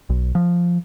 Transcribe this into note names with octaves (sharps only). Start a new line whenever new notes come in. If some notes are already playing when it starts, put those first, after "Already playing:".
B1
F3